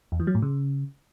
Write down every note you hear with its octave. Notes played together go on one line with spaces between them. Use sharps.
E2
E3
F#3
A2
C#3